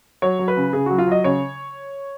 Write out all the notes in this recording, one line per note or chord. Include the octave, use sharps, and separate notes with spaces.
F#3 C#5
F#3
B4
C#3
C#3 G#4
F#3 F#4
F4
F#3 D#5
C#3 C#5